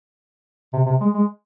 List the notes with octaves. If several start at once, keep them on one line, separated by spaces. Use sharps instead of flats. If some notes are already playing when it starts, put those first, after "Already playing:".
C3
C3
G#3
G#3